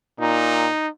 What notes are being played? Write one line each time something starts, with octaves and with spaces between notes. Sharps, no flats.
A#2 D#4